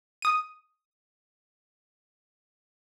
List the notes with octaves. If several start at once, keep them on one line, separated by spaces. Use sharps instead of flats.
D#6 D#7